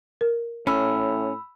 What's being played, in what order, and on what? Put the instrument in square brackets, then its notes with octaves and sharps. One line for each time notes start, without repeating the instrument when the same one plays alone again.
[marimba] A#4
[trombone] A2 [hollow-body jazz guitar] C#4 [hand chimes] B5 E6